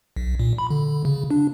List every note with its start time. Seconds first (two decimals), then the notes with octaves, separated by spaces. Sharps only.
0.16 B1
0.39 A#2
0.58 B5
0.70 D3
1.05 C#3
1.31 D4